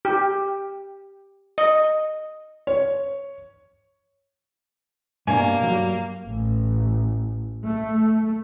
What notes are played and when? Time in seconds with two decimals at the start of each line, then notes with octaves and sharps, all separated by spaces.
0.05 G4
1.58 D#5
2.67 C#5
5.27 G2 B2 A#3 D4 G#5
5.63 G2 F#3 G3
6.27 A1
7.64 A3